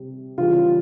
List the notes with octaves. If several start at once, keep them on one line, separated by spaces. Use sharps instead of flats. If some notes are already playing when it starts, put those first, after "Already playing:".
Already playing: C3 G3
C#3 E3 G3 F4